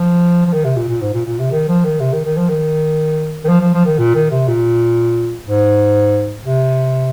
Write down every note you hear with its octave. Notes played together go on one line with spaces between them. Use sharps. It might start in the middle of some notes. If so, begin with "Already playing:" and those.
Already playing: F3
F3
D#3
C3
A#2
A#2
G#2
A#2
A#2
C3
D#3
F3
D#3
C3
D#3
D#3
F3
D#3
D#3
F3
F3
F3
D#3
A#2
D#3
C3
A#2
G#2
C3